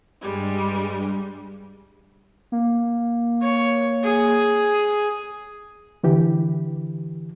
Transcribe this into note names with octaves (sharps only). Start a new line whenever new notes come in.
G2 G3 G#3
A#3
C#5
G#4
D3 E3 G4